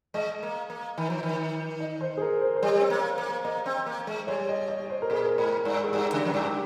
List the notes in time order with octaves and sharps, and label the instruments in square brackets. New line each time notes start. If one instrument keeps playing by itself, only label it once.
[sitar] G#3 [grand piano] D#5
[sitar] A#3
A#3
D#3
F3
D#3
[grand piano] D#5
C5
G#4
A#4
C5
C5
[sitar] G3 [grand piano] C#5
[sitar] C4
A#3
A#3
[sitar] A#3 [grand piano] D#5
[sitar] C4
A#3
G#3
[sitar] G3 [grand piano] C#5
[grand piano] D#5
D#5
C5
A#4
[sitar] A#2 [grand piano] G#4
[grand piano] A#4
[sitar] G#2
G2
[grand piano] G#4
[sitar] G2 [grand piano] G4
[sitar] C#3
F2
[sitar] G2 [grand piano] G4